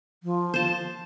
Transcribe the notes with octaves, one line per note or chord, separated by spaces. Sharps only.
F3
C5 A5